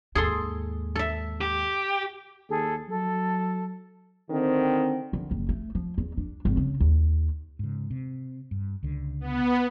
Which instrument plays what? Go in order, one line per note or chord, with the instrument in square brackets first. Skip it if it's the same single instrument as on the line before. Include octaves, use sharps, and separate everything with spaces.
[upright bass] D#2 G#2 [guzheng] G#4 A4 C6
[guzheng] A4 E5
[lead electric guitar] G4
[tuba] D#2 [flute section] G#4 A4
[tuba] F#3 [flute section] A4
[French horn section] D3 D#3 C4
[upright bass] D3
F#1
A3
F3
E2
D4
G#1
C#3
D#2
[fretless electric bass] G#2 C#3
C3
G2
C#2 D3
[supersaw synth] B3